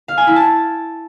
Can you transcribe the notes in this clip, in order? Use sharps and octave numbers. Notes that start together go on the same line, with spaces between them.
F5
G#5
E4
A5